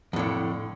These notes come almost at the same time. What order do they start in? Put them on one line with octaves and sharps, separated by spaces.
F2 A2 D3